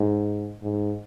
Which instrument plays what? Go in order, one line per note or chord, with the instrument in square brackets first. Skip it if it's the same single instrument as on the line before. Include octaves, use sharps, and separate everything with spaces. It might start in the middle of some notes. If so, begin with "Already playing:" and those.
Already playing: [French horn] G#2
G#2